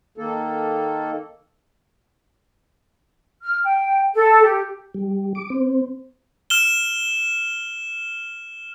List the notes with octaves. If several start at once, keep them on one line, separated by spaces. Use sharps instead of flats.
D#3 A#3 A4
F6
G5
A4
G4
G3
D6
C4
F6 E7 G7